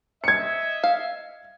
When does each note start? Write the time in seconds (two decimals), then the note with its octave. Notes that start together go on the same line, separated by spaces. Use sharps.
0.24 D#5 E5 G#6 C#7
0.84 F5